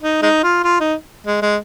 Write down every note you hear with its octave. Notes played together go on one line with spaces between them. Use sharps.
D#4
G#3 D#4
F4
F4
D#4
G#3
G#3